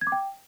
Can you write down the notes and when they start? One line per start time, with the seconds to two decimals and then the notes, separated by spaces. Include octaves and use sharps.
0.01 G#6
0.07 D6
0.12 G5